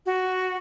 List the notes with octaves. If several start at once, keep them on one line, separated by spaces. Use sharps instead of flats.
F#4